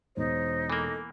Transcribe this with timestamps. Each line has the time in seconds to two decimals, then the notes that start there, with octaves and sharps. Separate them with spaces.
0.17 E1 D#4 C5
0.70 E3 A#3 A4